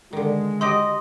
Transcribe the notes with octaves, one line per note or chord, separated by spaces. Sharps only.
D3 D#3 G#3
F#3 G4 D#5 G5 C6